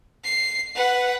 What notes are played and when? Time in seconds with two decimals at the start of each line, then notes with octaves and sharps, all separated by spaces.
0.24 C7
0.75 B4 F#5